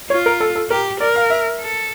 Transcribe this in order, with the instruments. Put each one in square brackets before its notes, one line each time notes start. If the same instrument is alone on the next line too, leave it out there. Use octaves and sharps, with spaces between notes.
[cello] F4 [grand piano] C#5
[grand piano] A#4
A4
A4
[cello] G4 [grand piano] A#4
[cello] A#4 [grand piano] D5
[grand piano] F5
E5
[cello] A4